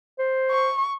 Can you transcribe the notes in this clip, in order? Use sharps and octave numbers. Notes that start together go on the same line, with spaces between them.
C5
C#6